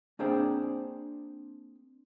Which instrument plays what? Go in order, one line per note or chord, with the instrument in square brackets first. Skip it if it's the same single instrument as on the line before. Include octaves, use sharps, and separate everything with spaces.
[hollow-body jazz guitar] A#3 C4 D4 G#4 C5 G5